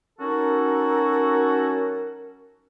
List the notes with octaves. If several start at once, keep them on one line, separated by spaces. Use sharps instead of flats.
F#3 C#4 D#4 F#4 A4 A#4